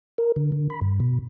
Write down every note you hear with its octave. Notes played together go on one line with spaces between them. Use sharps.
A#4
D3
D3
B5
G2
B2